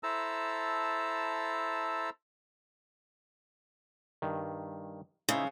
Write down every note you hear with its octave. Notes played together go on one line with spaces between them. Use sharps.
E4 A4 C5 A5 A#5 E6
G2 D#3
C#3 D#4 E4 C5